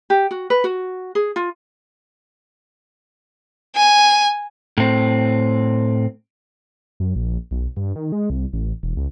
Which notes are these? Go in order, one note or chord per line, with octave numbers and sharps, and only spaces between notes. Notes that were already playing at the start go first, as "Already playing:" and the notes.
G4
F#4
B4
F#4
G#4
F4
G#5
A2 C4
F#2
A#1
B1
G2
D#3
G#3
C2
A1
E1
C#2